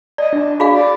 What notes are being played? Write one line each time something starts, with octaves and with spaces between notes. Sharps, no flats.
D5 D#5
D4
F#4 G#4 F5
D5